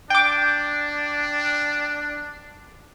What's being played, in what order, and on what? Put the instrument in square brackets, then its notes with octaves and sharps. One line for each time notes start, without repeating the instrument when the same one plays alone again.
[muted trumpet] D4 [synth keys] G5 D6